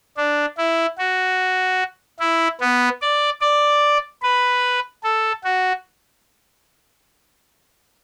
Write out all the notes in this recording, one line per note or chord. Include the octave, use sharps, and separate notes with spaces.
D4
E4
F#4
E4
B3
D5
D5
B4
A4
F#4